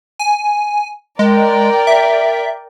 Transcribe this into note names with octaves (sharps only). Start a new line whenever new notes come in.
G#5
G#3 A#4 D5 G5
E5